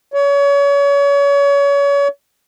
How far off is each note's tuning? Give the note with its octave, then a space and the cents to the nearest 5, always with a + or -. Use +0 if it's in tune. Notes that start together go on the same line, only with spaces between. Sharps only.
C#5 +30